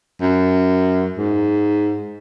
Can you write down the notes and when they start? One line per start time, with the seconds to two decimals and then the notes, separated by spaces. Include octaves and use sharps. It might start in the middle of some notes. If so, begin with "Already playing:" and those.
0.22 F#2
1.17 G#2